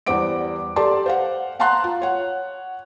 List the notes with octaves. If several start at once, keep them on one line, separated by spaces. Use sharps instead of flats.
E2 G3 C5 F#5 D6 D7
G4 A4 D5 A5 C6
C5 F5 F#5
F5 F#5 A5 A#5 C6 F#6
F4
C#5 F#5